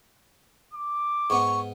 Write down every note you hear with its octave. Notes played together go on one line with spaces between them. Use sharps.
D6
G#2 B3 C#6